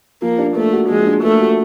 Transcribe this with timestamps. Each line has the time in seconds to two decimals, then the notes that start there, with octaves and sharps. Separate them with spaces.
0.22 F3 A#3
0.38 D4
0.56 A3 A#3
0.73 F#4
0.89 F3 G#3
1.07 D4
1.24 A3 A#3
1.41 F#4